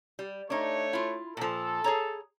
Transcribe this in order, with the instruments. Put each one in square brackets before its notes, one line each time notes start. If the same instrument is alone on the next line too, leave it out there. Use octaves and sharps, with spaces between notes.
[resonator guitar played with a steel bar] G3
[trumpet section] A3 C#5 [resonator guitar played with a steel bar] D4 D#4
[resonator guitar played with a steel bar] E4 F4
[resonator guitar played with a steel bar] A#2 F3 [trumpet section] A4
[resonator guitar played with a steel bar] G#4 C#5 A#5